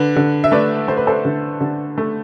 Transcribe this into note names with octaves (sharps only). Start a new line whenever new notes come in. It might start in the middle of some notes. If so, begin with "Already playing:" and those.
Already playing: D3 B4
D3
E5
A3 B4 D5
A3 C5
B4
A4 C5
D3
D3
A3